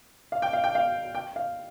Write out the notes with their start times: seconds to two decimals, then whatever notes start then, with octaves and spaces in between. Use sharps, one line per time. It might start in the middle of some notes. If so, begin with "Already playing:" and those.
0.32 F5
0.42 G5
0.53 F5
0.64 G5
0.75 F5
1.15 G5
1.36 F5